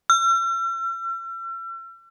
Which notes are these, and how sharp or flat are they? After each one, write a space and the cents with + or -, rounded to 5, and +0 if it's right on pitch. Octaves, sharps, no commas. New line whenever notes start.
E6 +45